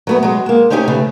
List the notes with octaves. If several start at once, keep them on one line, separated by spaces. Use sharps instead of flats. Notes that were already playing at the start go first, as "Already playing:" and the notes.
F#3 A3 B3
F#3 G#3
G#3 A#3
A3 C4 C#4 D#4 G4 G#5
C#3 E3 A3